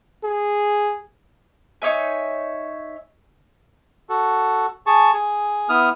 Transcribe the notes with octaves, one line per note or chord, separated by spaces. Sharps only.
G#4
D#4 C#5 E5 G#5
F#4 A4
G#4 A5 C#6
G#4
B3 E4 D#6 F6